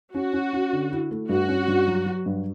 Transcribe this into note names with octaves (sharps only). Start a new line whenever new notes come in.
C#4 F#4
C#4
C#4
D3
E4
A3
G2 F#4
C#4
G2
F#3
F#3
G2